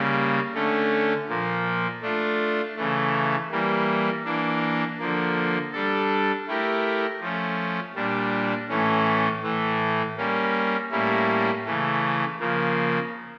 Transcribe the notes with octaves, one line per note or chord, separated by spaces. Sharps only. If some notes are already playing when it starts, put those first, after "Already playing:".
Already playing: C#3 G3 A#3
D3 A3 C#4
A#2 F3 A#3
A3 D4 F4
C#3 E3 A3
E3 G3 A#3
E3 A#3 D4
D3 F3 A#3
G3 D4 A4
A3 E4 G4 A#4
F3 A3 C#4
A#2 G3 D4
A2 E3 A3 C#4
A2 E3 A3
G3 A#3 C#4
A2 G3 A#3 C#4 E4
C#3 E3 A3
C#3 F3 A#3